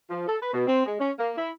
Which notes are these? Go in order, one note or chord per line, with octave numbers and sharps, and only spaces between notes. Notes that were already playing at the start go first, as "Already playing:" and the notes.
F3
A4
B4
B2
C4
G#3
C#4
A#3
E4